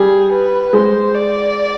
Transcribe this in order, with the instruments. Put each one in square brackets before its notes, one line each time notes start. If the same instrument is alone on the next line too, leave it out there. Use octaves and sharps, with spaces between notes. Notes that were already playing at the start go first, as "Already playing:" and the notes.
Already playing: [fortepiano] G3 [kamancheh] G#4
[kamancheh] B4
[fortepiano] G#3 [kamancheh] C5
[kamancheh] D5